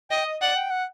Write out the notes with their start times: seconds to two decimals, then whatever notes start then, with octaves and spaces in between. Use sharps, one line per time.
0.10 D#5 G5
0.25 D#5
0.42 D5 F#5
0.56 G5
0.70 F#5